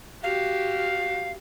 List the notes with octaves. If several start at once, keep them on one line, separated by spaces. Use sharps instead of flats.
F#4 G4 F5